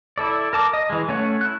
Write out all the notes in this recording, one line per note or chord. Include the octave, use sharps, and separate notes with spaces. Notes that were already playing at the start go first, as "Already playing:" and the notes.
E4 A4 D5
A#4 A5 D6
D#5
E3 G#3
A3 C#4 C#5 F#5
E4 F#6